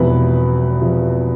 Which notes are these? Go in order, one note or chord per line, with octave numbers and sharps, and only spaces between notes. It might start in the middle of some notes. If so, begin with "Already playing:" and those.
Already playing: E1 E2 C3 F3 B4
C3 F3